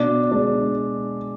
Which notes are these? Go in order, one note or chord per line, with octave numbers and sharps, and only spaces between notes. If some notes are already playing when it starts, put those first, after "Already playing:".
Already playing: B2 D4
G#3 D4